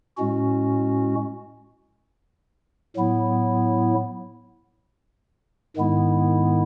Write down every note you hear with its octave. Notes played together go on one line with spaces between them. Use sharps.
A2 G#3 C#4 F#4
A2 F#3 B3 E4
G#2 D#3 G#3 B3 E4